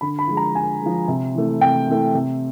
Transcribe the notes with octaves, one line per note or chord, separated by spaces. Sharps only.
D3 B5
B5
F3 G#3
A#5
D3 G#5
F3 G#3
C3
E3 A3
C3 G5
E3 A3
C3